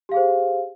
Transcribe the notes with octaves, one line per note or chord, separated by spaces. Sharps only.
G4 G#4 C5 F5